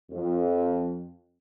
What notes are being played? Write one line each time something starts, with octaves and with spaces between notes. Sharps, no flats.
F2